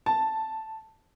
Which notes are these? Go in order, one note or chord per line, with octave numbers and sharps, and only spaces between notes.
A5